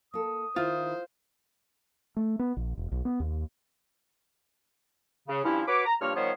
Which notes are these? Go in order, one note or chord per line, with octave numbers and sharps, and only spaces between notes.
A#3 A4 D#6
D#3 E4 F4 C5
A3
B3
A#1
E1
B1
B3
D#2
C#3
G2 F3 C#4 E4
F#4 B4 C#5 B5 D6
A#5
G2 F3 A#3 C#5 C#6 F6
D#3 F3 G3 B3 C5 C#5